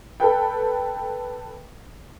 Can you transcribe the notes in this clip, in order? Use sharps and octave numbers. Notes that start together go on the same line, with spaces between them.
A4 B4 G5